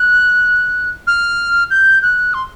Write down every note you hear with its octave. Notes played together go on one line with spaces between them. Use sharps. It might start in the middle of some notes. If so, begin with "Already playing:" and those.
Already playing: F#6
F6
G6
F#6
C6